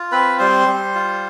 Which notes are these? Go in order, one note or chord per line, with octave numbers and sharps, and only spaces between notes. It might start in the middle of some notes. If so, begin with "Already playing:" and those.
Already playing: F4
C4 B4 B5
G3 C5 C6
G3
F4